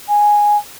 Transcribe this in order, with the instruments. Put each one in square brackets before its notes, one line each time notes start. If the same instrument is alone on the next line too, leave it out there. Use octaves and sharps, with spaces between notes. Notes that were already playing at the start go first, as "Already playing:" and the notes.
[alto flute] G#5